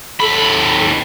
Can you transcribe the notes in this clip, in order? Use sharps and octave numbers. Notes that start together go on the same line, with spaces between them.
D#2 A4 B5